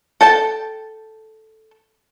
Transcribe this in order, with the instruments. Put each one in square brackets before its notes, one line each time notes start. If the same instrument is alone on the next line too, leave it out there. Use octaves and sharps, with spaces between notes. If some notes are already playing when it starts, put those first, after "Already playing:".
[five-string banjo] A4 G5 A5